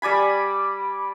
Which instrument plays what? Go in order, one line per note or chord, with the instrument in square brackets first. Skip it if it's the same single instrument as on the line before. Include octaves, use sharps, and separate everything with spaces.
[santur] G3 D5 G#5 B5